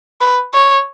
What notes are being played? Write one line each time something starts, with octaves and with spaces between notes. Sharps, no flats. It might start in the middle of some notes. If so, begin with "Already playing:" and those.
B4
C#5